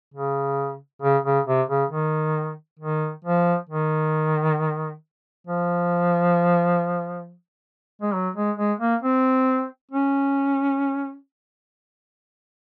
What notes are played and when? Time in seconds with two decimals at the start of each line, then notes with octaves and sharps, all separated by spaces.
0.14 C#3
1.02 C#3
1.24 C#3
1.47 C3
1.69 C#3
1.91 D#3
2.80 D#3
3.24 F3
3.70 D#3
5.47 F3
8.02 G#3
8.14 F#3
8.36 G#3
8.57 G#3
8.80 A#3
9.03 C4
9.91 C#4